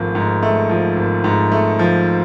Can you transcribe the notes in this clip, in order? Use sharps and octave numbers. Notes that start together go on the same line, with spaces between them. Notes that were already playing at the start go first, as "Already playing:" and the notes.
Already playing: G#1 F3 A3
G#2
A3
F3
G#1
G#2
A3
F3